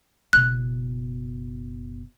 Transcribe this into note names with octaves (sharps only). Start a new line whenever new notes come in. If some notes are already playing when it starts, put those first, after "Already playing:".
F#1 B2 F#6